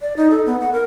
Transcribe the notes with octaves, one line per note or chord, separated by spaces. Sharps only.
D5
D#4
A4
B3
F#5
A#4